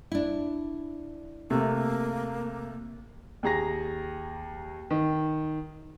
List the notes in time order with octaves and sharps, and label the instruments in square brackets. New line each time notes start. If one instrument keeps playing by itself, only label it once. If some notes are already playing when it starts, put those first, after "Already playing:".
[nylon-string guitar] D4 E4
[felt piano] C3 A3 [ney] A#3
[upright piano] D#2 G#4 A#5 A#6
D#3